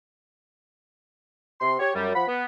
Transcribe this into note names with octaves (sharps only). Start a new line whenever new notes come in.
C3 C6
G4 C#5
F#2 G3
F3 F#5 B5
B3